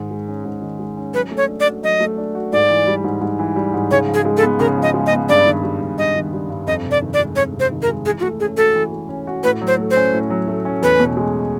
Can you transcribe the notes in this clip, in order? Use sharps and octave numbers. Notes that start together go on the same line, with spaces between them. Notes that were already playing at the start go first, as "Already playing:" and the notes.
Already playing: G#2 D#3
G#3
C#4
G#2
D#3
G#3
C#4
F#3 B4
A3
C#5
D4
D5
F#4
F#3 D#5
A3
D4
F#4
G#2 D5
E3
G3
G#2
G#2
E3
G3
G#2
C#3 C#5
F3
G#4
G#3
A4
B3
C#3 A#4
F3
D#5
G#3
D#5
B3
G2 D5
D#3
G3
G2
G2 D#5
D#3
G3
G2
F2 D#5
C3
D5
D#3
D5
G#3
F2 C#5
C3
C5
D#3
A#4
G#3
E3 G#4
F4
A3 F#4
C#4 G#4
F#4 A4
E3
A3
C#4
F#4
A2 B4
F#3
C5
A3
C5
C#4
A2
F#3
A3
C#4
E2 B4
B2
G#3